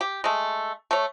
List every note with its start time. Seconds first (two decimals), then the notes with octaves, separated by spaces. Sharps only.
0.01 G4
0.24 G#3 A3
0.91 A3 C#5